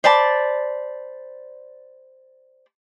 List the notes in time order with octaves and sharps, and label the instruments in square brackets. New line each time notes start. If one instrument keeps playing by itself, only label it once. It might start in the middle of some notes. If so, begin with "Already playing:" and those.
[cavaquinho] C5 D5 A5 B5